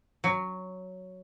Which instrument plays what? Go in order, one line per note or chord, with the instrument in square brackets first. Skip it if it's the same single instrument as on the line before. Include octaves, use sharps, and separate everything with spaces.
[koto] F#3